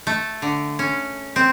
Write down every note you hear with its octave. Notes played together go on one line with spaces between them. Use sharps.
A3
D3
C#4
C4